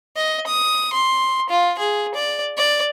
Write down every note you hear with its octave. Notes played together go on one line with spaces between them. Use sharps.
D#5
D#6
C6
F4
G#4
D5
D5